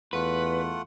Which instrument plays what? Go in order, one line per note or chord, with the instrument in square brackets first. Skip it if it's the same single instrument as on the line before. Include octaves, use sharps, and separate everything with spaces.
[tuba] E2 [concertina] A3 F4 F#5 [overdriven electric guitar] B4